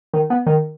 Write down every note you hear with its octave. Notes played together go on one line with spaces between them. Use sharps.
D#3
B3
D#3